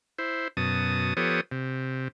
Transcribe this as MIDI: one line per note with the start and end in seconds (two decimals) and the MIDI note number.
0.18 0.48 64
0.18 0.48 72
0.57 1.14 42
0.57 1.14 47
0.57 1.14 81
0.57 1.14 87
1.17 1.41 53
1.17 1.41 59
1.17 1.41 67
1.17 1.41 69
1.17 1.41 73
1.17 1.41 87
1.52 2.08 48